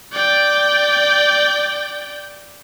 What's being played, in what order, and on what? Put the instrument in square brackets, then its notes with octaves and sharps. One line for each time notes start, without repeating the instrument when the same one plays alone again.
[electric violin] D5 G5